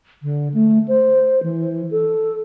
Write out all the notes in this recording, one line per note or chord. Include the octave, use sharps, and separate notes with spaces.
D3
A3
C5
E3
A4